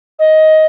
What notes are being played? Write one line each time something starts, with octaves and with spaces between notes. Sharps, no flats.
D#5